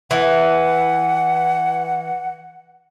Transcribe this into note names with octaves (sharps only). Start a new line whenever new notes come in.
E3 F#5